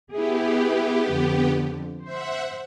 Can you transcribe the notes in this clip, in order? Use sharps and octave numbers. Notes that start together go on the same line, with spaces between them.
B3 E4 G4 G#4
F2 D3
C5 E5 F#5